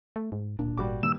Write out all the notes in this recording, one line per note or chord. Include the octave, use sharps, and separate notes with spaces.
A3
G#2
D1 A#2 D4
G#1 G3 F#4 D6
G2 D#3 A#3 E6